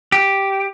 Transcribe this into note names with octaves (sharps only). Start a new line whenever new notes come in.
G4